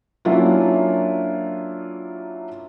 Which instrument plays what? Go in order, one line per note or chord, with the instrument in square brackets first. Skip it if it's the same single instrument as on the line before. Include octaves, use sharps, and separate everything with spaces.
[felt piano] F#3 A#3 C#4 D4 E4 F4